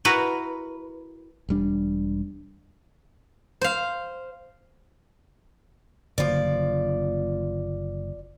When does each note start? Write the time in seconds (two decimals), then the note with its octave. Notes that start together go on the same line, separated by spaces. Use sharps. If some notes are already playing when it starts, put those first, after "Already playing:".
0.05 E4 F#4 A#4 B4
1.49 E1 G3 D4
3.61 C5 F5
6.18 F#1 D3 F3 A#3 D5